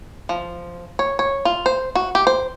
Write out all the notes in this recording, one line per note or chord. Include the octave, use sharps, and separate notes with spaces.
F3
C#5
C#5
F4
C5
F#4
G4
C5